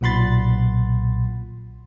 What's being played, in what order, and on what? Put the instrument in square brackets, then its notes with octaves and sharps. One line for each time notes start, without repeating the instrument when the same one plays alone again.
[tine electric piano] B1 A#2 F#5 B5 C6 A6